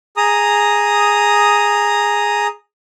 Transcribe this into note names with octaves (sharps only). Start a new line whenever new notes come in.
G#4 A#5 D#6